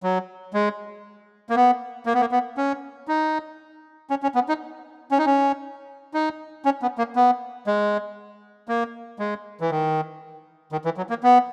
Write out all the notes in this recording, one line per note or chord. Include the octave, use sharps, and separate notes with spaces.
F#3
G#3
A#3
B3
A#3
B3
A#3
B3
C#4
D#4
C#4
C#4
B3
D#4
C#4
D#4
C#4
D#4
C#4
B3
A#3
B3
G#3
A#3
G#3
E3
D#3
D#3
E3
F#3
A#3
B3